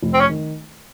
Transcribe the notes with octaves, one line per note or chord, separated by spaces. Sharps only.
F1
C4
C#4
D#3